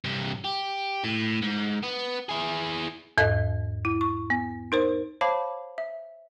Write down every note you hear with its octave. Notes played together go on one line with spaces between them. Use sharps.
G2 C3
G4
A2
G#2
B3
E4 G#4
E2 G#2 A4 D#5
E4
C#6
B3
D#4 A#4 C5
C5 C#5 F5 A5 B5 D6
E5